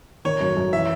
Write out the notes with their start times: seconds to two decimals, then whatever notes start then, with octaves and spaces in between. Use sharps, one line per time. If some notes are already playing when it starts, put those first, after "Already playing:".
0.25 D#3 C#5
0.41 F#2
0.57 F#2
0.72 E3 E5